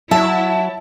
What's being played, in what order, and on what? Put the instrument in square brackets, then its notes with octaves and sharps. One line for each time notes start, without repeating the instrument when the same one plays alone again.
[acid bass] F#3 [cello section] E4 [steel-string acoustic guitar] E5 [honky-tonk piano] A5